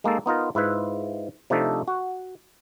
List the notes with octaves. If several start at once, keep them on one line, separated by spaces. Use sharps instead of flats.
G#3 A#3 D#4 A4
B3 D#4 F4 A#4
G#2 E4 F4 B4 E5
C3 F3 A3 D4 D#4 A4
F#4